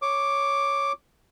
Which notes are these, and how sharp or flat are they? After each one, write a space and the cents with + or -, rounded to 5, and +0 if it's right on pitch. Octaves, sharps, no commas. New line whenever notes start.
C#5 +0 D6 +0